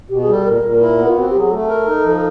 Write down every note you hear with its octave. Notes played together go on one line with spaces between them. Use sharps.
B2 G4
G#4
G3
A4
A#2 A#4
A#2
E4 A#4
B3
F4
C4 F#4
F#3 G4
G#4
A3 A4
A#4
D#4
F3